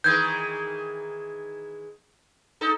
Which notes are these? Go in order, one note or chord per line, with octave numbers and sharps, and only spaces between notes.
D#3 E3 G#3 G6 G#6
D#4 A4